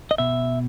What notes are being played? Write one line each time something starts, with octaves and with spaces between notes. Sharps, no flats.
D#5
B2 E5